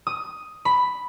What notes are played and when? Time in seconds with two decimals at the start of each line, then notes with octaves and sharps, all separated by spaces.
0.07 D#6
0.65 B5